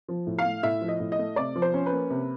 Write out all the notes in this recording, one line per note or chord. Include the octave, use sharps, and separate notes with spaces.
F3
A2
F5
A3
A2 E5
F3
D#5
A2
D#5
A3
C3 D5
F3
C5
C#4
B4
A#3
C3